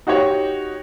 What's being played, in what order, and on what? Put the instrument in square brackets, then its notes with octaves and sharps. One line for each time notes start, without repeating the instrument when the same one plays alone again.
[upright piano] D#4 F#4 G4 C#5